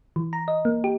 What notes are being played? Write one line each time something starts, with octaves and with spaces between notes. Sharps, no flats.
E3
A#5
D#5
A#3
G4